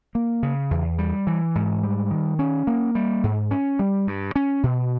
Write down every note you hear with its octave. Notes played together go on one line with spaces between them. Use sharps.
A#3
C#3
E2
G3
E3
G#2
G3
D#3
C#4
A#3
G3
G#2
C#4
G3
G2
C#4
B2